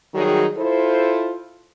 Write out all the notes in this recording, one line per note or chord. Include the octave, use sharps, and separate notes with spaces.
D#3 F#3 G3 D#4 F#4 G#4
E4 F4 A4 C5